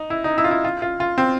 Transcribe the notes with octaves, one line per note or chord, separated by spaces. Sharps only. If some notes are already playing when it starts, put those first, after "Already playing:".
Already playing: D#4
E4
D#4
E4
F4
E4
F4
F4
F4
C4